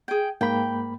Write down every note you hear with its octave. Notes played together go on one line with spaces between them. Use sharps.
G#4 G5
G#2 A#3 G5 B5